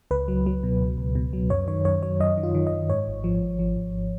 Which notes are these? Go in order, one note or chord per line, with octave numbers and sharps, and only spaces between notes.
C#2 B4
F#3
F#3
B2
C#2
C#2
B2
F#3
F#2 C#5
D#3 C#5
F#2 C#5
F#3 C#5
F#2 D#5
D#3
F4
D#3
D#5
F#2
G#2 C#5
G#1
F3
G#1
F3
G#1